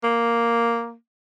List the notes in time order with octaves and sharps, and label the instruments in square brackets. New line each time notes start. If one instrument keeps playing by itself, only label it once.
[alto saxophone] A#3